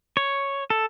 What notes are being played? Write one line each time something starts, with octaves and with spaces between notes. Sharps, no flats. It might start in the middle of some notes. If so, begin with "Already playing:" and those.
C#5
A4